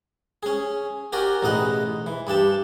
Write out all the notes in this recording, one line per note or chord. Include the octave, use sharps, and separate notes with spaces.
C#4 G#4
F#4 G4 A#4 D5 G#5
A1 E2 B2 D#4 D#5 F#5
E3
G2 D4 G4 A5